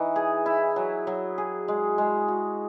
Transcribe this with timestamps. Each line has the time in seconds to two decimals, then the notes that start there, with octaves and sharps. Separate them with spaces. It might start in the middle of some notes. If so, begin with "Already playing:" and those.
Already playing: E3 D#4
0.16 G#4
0.46 E4
0.76 F#3
1.07 F#3
1.38 G#4
1.68 G#3
1.98 G#3
2.28 F#4